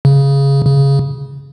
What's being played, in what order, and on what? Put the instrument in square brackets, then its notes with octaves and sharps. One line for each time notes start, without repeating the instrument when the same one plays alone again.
[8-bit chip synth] C#3
C#3